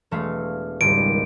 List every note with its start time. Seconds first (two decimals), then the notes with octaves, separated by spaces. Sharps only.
0.11 E1 A3 F5
0.81 G#1 C#2 D#3 G3 D7